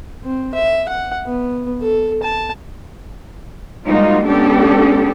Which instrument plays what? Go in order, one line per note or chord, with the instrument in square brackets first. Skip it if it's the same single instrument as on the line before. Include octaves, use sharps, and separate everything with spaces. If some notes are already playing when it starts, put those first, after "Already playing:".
[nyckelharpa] C4
E5
F#5
B3
A4
A5
[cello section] G3 G#3 A#3 D#4 F4 F#4
G#3 B3 C#4 D4 G4 A4